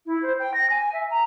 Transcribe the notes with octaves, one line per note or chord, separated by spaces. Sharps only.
E4
C5
G5
A#6
G#5
E5
A#5